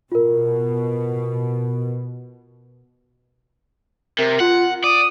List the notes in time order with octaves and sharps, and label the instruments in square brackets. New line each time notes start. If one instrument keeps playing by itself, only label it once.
[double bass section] B2 [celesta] F4 A#4
[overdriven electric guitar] C3 [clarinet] A#4
[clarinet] F4 [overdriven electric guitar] F#5
[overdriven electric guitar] D5 [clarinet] D#6